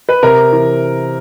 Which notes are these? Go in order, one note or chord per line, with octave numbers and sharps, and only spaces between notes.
B4
C3 A#4
E3